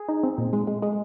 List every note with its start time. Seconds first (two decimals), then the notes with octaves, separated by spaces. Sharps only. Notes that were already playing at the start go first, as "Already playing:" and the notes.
Already playing: G#4
0.09 D#4
0.23 C4
0.38 A#2
0.53 G#3
0.67 G#3
0.82 G#3